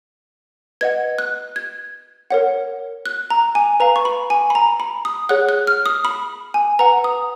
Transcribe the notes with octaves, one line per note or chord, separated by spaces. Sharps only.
B4 D#5 F#5 G#6
F#6
G#6
A#4 C#5 F#5
F#6
A#5
G#5
B4 F5 A#5
C#6
B5
G#5
B5
A#5
B5
D#6
G#4 C#5 F#5 F#6
F#6
F6
D#6
B5
G#5
B4 F#5 A#5
D#6